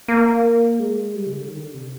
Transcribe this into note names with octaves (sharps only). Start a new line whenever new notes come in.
A#3
G#3
G3
C#3
D3
D#3
D3
C3